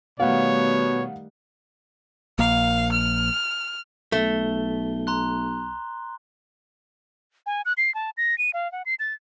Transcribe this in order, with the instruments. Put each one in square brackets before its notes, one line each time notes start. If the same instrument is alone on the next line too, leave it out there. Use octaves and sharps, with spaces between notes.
[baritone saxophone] B2 [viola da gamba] D#3 G3 A3 [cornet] C#5 [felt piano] F5 F#5
[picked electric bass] A#1 A#3 [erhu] F5
[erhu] F6
[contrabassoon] B1 [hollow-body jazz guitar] A3 [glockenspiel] G7
[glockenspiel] A#5 C6 F#6
[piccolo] G#5
F#6
C7
A5
A#6
D#7
F5
F#5
C7
A6